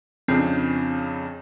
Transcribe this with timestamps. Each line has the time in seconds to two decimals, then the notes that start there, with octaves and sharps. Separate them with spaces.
0.28 F2 C#3 C4 D4